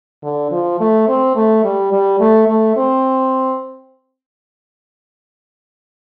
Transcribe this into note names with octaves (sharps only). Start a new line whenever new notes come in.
D3
F3
A3
C4
A3
G3
G3
A3
A3
C4